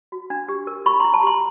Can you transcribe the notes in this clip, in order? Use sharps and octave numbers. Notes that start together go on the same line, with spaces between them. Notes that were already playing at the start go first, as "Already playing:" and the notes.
F#4
D4
G4
A#4
E4 B5 C#6
E4 A#5 C6
A5 B5
G4 A#5 C6